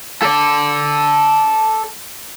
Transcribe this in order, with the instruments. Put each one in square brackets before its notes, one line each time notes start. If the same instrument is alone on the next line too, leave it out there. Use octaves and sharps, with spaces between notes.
[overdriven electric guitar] A4 D5